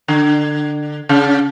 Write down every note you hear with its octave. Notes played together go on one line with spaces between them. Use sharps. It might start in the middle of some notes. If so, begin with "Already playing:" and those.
D3
C#3